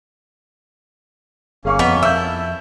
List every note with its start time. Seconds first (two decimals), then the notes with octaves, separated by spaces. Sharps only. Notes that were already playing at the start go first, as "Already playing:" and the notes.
1.65 G1 A#3 C#4 G#4 F5 C#6
1.79 F2 F3 B3 D#5 F7
2.03 E4 E6 G6
2.16 A5